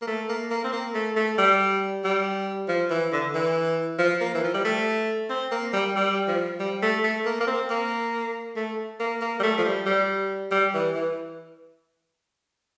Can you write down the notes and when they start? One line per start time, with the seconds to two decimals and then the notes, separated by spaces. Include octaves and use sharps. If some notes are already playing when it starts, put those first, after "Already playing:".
0.02 A#3
0.07 A3
0.29 A#3
0.51 A#3
0.64 C4
0.73 A#3
0.94 A3
1.16 A3
1.38 G3
2.04 G3
2.68 F3
2.90 E3
3.12 D3
3.34 E3
3.99 F3
4.21 A#3
4.34 E3
4.44 F3
4.54 G3
4.65 A3
5.30 C4
5.51 A#3
5.73 G3
5.96 G3
6.28 F3
6.60 G3
6.82 A3
7.03 A3
7.25 A#3
7.40 A#3
7.47 C4
7.70 A#3
8.56 A3
9.00 A#3
9.21 A#3
9.39 G3
9.43 A3
9.58 F3
9.65 G3
9.86 G3
10.51 G3
10.74 E3
10.95 E3